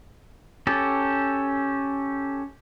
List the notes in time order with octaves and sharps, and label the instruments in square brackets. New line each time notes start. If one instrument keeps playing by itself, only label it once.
[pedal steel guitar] C#4 G4 A4